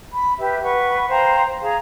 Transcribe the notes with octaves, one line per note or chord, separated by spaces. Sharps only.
B5
G4 B4 E5
B4 F#5 C#6
C5 F5 G5 A#5
G#4 F5 A#5